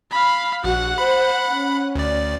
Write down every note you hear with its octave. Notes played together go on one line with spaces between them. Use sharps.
F5 B5
A#1 F#4 F#5
C5 B5
C#4
D2 D5